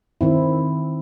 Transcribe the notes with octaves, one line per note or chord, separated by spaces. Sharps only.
D#3 C4 E4